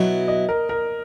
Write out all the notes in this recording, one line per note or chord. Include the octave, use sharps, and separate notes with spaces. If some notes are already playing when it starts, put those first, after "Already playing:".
Already playing: B2 F#3 B3 E4 D#5
D#5
A#4
A#4